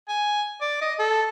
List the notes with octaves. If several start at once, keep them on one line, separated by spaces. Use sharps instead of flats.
G#5
D5
D#5
A4